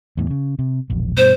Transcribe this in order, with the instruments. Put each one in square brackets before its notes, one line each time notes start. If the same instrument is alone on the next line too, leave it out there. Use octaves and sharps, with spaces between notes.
[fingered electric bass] E2 A2
C#3
C3
E1 A#1
[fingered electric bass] G2 B2 [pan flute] C5